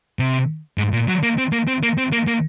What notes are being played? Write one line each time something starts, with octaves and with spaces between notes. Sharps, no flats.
C3
G#2
A#2
F#3
A#3
C4
A#3
C4
A#3
C4
A#3
A#3